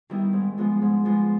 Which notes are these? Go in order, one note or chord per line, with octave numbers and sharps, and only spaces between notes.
D#3 G3 B3 E4
G#2
F3 G#3 B3
G#2
F3 G#3 B3